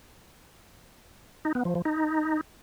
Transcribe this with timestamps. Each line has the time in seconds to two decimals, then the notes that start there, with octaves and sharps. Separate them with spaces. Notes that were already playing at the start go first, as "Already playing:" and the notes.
1.45 D#4
1.55 B3
1.65 F3
1.75 F3
1.85 D#4